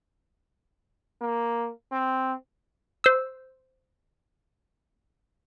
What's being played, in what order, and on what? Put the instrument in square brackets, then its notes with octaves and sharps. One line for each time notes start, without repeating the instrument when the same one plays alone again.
[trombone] A#3
C4
[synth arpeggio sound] C5 E6